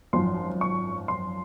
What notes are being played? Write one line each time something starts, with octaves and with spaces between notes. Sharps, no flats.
G#1 F#2 F3 C6
C#6
C6